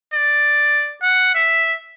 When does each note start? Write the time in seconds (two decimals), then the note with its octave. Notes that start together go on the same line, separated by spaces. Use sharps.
0.14 D5
1.03 F#5
1.35 E5